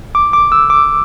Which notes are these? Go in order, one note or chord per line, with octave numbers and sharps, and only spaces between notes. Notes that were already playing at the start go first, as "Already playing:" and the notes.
D6
D6
E6
D6